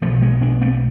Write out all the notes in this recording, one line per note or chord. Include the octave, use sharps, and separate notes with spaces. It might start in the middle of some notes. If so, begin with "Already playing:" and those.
B1 B2 F3 A3
G#3 B3
B3 D4
A3 C4